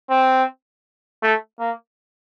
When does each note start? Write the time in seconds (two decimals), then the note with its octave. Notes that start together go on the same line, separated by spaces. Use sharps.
0.10 C4
1.23 A3
1.60 A#3